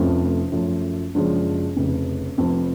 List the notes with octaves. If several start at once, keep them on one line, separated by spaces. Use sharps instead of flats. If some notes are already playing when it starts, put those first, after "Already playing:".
Already playing: F1 F2 F3 A3 C#4
F#2 F3 A3
F#1 F#2 F3 G#3 D4
F1 F2 C#3
F1 F2 F3